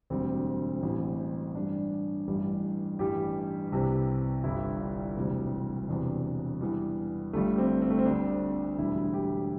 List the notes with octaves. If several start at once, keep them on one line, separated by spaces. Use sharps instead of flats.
E1 D2 D3 G3 C4
A1 A2 G3
A1 G2 G3 D4
A1 G2 E3 G3
A1 G2 E3 G3 G4
C2 C3 E3
G1 G2 E3 G3 E4
D4
E1 D2 C3 E3 G3
E1 E2 C3 D4
E2 E3 G3
G1 G2 D3 G3 A3
C4
C4
A3
C4
D2 D3 G3 D4
E1 D2 D3 G3 E4
G4